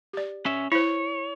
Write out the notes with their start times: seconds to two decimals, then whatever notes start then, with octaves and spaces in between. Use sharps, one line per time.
0.13 G4 D5
0.46 C#4 E5
0.72 E4 C5 C#5